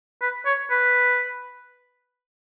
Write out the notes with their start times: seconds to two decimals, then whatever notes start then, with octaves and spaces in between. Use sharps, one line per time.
0.22 B4
0.45 C#5
0.71 B4